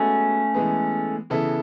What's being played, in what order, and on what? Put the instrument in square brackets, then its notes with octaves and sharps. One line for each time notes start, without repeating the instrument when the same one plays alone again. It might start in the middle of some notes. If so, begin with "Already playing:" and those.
Already playing: [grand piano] G#3 B3 F#4 B4 [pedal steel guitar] A3 C#4
[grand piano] E3 G#3 B3
C#3 E3 B3 E4 A4